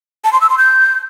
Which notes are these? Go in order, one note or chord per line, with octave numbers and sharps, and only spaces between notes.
A5
C6
E6
C6
G6